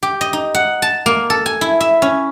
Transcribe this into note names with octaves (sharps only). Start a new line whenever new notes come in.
G4
D#5
D#4
F#5
A5
A#3
A4
G#5
E4
E5
C#4